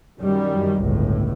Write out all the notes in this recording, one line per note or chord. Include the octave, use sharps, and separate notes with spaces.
F#2 D#3 G3
G1 C#2 A2